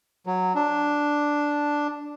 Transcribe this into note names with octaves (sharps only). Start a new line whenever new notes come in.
F#3
D4